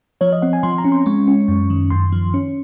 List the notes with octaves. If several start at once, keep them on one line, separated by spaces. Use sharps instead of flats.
F3 C#5
D#5
C4 F#5
G#5
F3 C6
A#5
C#4
C6
G#3 C#6
C#4
F#2
D#3
F#2 C6
F3
C#4